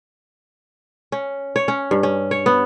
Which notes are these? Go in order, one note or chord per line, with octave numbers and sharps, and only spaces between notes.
C#4
C#5
C#4
G2
C#4
C#5
B3